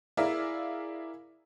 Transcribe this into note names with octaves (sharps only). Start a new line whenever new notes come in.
E4 G#4 A#4 D5 E5 F5